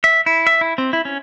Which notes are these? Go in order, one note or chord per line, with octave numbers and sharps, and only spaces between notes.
E5
E4
E5
E4
C4
E4
C#4